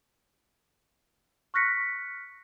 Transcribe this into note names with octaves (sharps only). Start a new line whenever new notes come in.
C#6 F6 F#6 A#6 B6 C#7